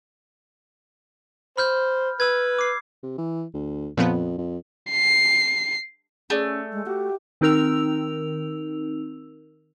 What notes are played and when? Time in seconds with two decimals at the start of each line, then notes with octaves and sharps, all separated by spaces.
1.57 C5 B5 F6 G6
2.20 B4 E6 G#6
2.59 D6 C7
3.03 C3
3.18 E3
3.54 D2
3.97 F2 A#2 F3 B3
4.38 F2
4.91 C7
6.30 A3 C#4 G#4 D5
6.72 G#3
6.86 F#4 G4
7.41 D#3 C4 D#4 A#4 E6 F7